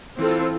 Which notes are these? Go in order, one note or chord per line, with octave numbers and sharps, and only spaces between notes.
E3 C4 F4 A4